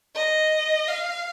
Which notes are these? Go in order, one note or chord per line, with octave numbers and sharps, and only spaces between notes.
D#5
F5